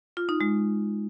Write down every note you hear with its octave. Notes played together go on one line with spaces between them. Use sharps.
F4
D#4
G#3